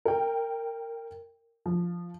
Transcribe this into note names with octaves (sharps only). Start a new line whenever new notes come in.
A#4 G5
F3